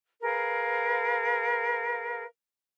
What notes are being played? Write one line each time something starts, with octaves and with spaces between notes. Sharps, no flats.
G#4 A#4 B4 F5